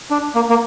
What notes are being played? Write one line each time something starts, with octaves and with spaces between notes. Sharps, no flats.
D4
A#3
A#3